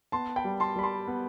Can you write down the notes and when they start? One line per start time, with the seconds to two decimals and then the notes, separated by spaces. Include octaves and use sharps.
0.12 B3 A5 C6
0.36 G5 B5
0.44 G3
0.60 A5 C6
0.76 G3 B5
0.83 A5 C6
1.07 B3